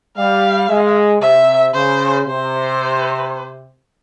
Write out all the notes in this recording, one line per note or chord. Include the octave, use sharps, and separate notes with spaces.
G3 F5
G#3
C3 E5
C#3 C5
C3 C5